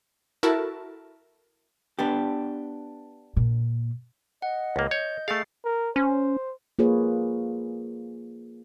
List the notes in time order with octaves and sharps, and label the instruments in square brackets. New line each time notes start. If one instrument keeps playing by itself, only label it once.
[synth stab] E4 F#4 A4 A#4 E5 A5
[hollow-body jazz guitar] B3 D4 G4
[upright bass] A#2
[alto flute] D#5 [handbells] F#5
[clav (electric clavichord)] C#2 A#3
[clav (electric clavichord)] C#5 [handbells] G6
[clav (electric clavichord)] A3 F5 [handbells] G#4 A6 C7
[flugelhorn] A#4
[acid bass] C#4 [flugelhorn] C5
[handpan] A#3 F4 G#4 B4 C#5